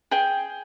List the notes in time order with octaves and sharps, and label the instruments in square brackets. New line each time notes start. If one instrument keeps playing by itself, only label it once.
[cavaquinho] G#4 G5